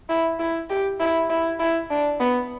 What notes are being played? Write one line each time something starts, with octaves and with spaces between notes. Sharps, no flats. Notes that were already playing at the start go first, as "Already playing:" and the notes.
E4
E4
G4
E4
E4
E4
D4
B3